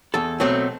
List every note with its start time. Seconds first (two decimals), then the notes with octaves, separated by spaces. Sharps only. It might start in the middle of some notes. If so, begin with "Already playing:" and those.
0.14 E2 A4
0.40 B2 F#3 A3 C4